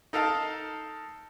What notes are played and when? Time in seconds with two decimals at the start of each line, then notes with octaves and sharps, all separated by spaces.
0.13 D#4 A4 A#4 F5 A5